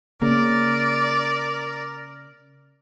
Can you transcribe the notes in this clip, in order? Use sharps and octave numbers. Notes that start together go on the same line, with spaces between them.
C#3 A#3 A#4 D5